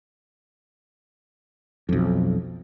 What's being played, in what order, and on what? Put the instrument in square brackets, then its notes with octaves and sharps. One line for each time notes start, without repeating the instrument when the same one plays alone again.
[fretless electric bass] B1 F2